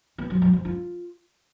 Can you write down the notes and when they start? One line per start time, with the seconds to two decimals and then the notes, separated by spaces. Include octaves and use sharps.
0.18 B3
0.30 F#3
0.42 F#3
0.53 F3
0.65 F4